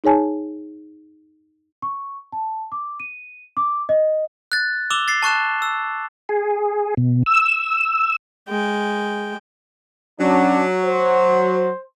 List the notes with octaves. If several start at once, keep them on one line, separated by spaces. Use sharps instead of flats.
D#4 G#4 C#5 G#5 A5
C#6
A5
D6
D#7
D6
D#5
F#6 A6
D6 E6 E7 F7 G7
A6 C7
A5 C#6 F#6 E7
E6
G#4
B2
E6
G#3 G5
F#3 C#4 D4
C5